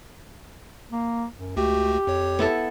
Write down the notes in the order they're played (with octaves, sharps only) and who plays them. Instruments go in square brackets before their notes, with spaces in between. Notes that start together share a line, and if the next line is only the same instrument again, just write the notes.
[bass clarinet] A#3
F#2
[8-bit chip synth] C#2 A3 F#4 [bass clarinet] G4
[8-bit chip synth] F2 C#5
[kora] B3 E4 A4